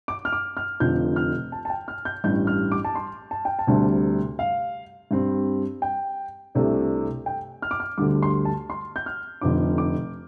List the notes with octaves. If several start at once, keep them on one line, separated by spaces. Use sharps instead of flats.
D6
F6
D6
F6
F1 F2 D3 F3 G6
F6
A5
A5
G5
F6
G6
A1 G2 G3 G6
F6
D6
A5
C6
A5
G5
A5
D2 C3 G3 D4
F5
G2 G3 C4
G5
C2 C3 A3 D4
G5
F6
D6
F6
D2 D3 G3 D6
C6
A5
C6
G6
F6
F1 F2 D3 D6
D6